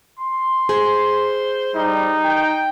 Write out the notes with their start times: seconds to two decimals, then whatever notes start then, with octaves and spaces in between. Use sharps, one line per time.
0.19 C6
0.69 G#4 C5
1.75 G3 D#4
2.25 G5